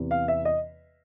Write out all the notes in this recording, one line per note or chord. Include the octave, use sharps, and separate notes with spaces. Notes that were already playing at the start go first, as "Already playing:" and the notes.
Already playing: E2 C3 E3
F5
E5
D#5